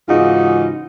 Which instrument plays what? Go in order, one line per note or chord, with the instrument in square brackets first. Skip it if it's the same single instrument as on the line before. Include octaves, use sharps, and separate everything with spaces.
[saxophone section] G#2 C#3 E3 D#4 F4 F#4